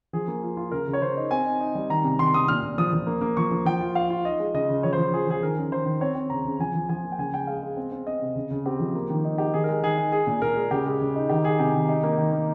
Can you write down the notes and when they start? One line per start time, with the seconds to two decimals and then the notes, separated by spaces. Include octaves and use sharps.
0.13 F3 G#4
0.28 A#3
0.43 F4
0.57 F4
0.72 C#3 A#4
0.87 C#3
0.93 C#5
1.01 C#3 C5
1.17 D#4
1.31 C4 G#5
1.46 D#4
1.60 D#4
1.75 G3
1.90 D#3 A#5
2.04 C3
2.19 D#3 C6
2.34 C3 D#6
2.48 A#2 F6
2.63 A#2
2.78 F3 D#6
2.93 F3
3.07 A#3
3.21 A#3
3.37 F3 C#6
3.51 F3
3.65 F3 G5
3.80 F4
3.95 F4 F5
4.10 F4
4.25 D#4 D#5
4.39 G#3
4.54 C#3 D#5
4.69 C#3
4.83 F3 C#5
4.93 C5
4.98 F3
5.13 F4 G#4
5.27 F3 G#4
5.43 D#3 A#4
5.57 C#4
5.72 D#3 C5
5.86 D#3
6.01 C4 C#5
6.15 C4
6.30 C#3 A#5
6.45 C#3
6.59 F3 G#5
6.75 F3
6.89 F3 G#5
7.04 A#3
7.12 G5
7.19 C#3 G#5
7.33 G#3 G5
7.47 G#3 F5
7.63 G#3
7.77 C4
7.92 C4
8.07 C4 D#5
8.22 C3
8.35 C#3
8.51 C#3
8.66 C4 G4
8.80 F3
8.95 A#3
9.10 D#3
9.25 D#4
9.38 D#4 G4
9.54 D#3 G#4
9.64 A#4
9.69 G#3
9.83 D#3 G#4
9.97 D#4
10.12 G#3 G#4
10.27 A#2
10.42 A#2 A#4
10.56 G#3
10.71 C#3 G4
10.86 G#3
11.01 C#3
11.16 D#4
11.29 D#3 G4
11.44 D#3 G#4
11.59 C3 G4
11.74 D#3
11.89 D#4
12.03 A#3
12.18 D#3
12.32 A#3